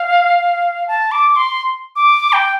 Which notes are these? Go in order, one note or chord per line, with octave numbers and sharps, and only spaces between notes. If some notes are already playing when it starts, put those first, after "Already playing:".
Already playing: F5
A5
D6
C6
D6
G5